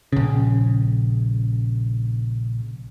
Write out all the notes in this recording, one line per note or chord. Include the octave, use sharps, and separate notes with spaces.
A#1 C#3